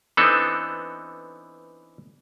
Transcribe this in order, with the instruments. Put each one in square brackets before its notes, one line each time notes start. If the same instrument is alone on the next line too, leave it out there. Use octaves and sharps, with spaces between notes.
[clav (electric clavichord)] E3 B3 C4 D4 D#4 A4